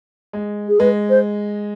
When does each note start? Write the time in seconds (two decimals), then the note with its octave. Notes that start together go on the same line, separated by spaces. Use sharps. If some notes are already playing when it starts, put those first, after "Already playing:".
0.33 G#3
0.69 G#4
0.80 G#3 B4
1.10 C5